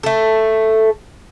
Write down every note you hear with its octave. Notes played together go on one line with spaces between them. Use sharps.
A3 A4